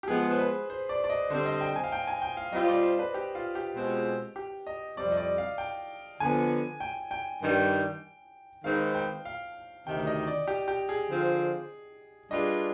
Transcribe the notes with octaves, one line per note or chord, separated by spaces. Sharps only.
G4
F3 G#3 B3 G#4
C5
B4
C5
D5
D5
D#5
D3 G3 C4 C5
D#5
G5
G#5
F5
G5
G#5
G5
F5
G3 C4 F4 D#5
D5
C5
B4
G4
F4
G4
B2 G#3 C4 F4 G#4
G4
D#5
F2 C3 G3 C4 D5
D#5
D5
F5
G5
D3 F3 B3 G#5
G5
G5
G2 D#3 G3
D#3 G#3 C4 D#4 B4 F5
G5
F5
D2 C3 D#3 G5
D#5
D5
G4
G4
G#4
D3 F3 C4 F4
G3 D4 F4 G#4 B4 D#5